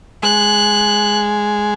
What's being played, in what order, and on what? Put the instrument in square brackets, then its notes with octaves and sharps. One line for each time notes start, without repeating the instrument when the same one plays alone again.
[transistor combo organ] G#3 [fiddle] F#6